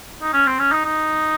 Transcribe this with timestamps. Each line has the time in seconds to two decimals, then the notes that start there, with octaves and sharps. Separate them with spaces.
0.22 D#4
0.33 C#4
0.47 C4
0.59 C#4
0.72 D#4
0.85 D#4